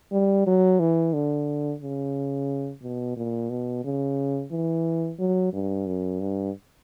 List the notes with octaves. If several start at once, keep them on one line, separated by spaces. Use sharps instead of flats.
G3
F#3
E3
D3
C#3
B2
A#2
B2
C#3
E3
F#3
G2
F#2
G2